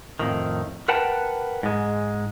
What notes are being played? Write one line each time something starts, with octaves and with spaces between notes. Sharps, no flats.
F2 A2 D#3
A#4 B4 F#5 G5 A5
G#2 G#3